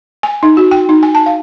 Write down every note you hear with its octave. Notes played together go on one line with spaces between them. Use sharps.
G#5
D#4
F#4
G5
D#4
G#5
A5
F5